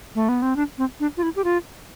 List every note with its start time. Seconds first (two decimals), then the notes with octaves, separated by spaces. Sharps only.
0.15 A3
0.29 B3
0.42 C4
0.56 D4
0.78 C4
1.00 D4
1.17 F4
1.23 E4
1.36 G4
1.44 F4